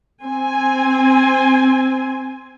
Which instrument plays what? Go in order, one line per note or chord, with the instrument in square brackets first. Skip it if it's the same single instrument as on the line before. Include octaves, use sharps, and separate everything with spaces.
[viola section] C4 G#5